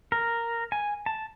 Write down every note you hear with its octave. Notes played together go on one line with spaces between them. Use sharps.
A#4
G#5
A5